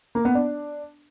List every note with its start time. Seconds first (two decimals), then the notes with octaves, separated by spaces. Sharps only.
0.15 A#3
0.25 B3
0.35 D4